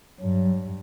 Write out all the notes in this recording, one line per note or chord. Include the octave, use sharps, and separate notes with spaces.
G2 F#3